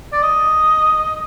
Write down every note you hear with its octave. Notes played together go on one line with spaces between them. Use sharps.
D5
D#5